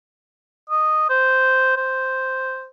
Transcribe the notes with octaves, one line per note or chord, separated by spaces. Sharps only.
D#5
C5
C5